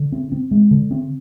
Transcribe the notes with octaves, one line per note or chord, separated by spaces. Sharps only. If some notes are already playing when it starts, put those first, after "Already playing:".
Already playing: D3
C4
C4
G#3
D3
C4